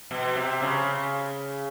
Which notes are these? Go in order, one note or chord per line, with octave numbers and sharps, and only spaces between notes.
B2
C3
C#3